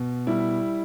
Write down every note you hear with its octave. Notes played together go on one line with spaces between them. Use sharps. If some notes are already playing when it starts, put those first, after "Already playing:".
Already playing: B2
G3 E4